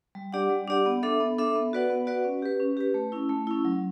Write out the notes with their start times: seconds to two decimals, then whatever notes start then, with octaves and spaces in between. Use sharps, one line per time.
0.15 G3
0.33 D4 G4 D5 F#5
0.50 G3
0.67 D4 G4 D5 F#5
0.86 B3
1.03 D4 A4 E5
1.20 B3
1.38 D4 A4 E5
1.55 B3
1.73 F#4 B4 D5 F#5
1.90 B3
2.07 F#4 B4 D5 F#5
2.25 C#4
2.42 G4 B4
2.60 C#4
2.77 G4 B4
2.94 A3
3.12 C#4 E4
3.29 A3
3.47 C#4 E4
3.65 F#3